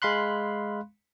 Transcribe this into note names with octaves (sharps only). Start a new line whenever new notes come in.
G#3 F5 B5 C6 F#6